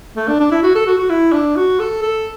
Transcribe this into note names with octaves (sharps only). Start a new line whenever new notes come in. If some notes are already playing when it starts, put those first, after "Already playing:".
A3
D4
D4
E4
F#4
A4
F#4
F#4
E4
D4
F#4
A4
A4